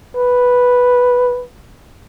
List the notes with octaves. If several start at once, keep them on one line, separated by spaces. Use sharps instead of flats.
B4